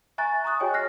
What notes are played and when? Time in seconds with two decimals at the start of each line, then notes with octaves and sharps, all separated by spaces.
0.18 E5 G#5 A#5 C#6 F#6 A6
0.44 A#5 C#6 D#6 F#6
0.60 F#4 G#4 C#5 D#5 G5 G#5
0.74 F6 F#6 A#6 C7